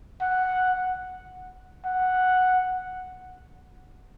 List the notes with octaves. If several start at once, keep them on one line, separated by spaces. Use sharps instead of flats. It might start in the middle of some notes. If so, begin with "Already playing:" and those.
F#5
F#5